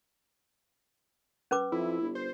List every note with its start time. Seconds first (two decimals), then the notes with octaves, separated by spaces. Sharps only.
1.51 C#4 B4 D6
1.72 F2 E4
2.01 G1
2.15 C5